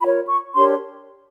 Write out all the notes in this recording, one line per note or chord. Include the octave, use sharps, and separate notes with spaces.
F4 A#4 C#5 B5
C#6
D4 G4 A#4 C#5 C6